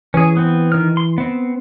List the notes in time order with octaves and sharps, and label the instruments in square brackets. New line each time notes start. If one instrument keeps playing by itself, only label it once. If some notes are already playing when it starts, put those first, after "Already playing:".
[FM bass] E3 [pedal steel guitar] C#4 G#4
[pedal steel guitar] B3 C4
D#3 F6
C6
B3 C4